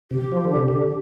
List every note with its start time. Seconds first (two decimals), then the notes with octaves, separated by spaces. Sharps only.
0.11 C3 G4
0.32 F3
0.44 D3
0.56 C3
0.68 D3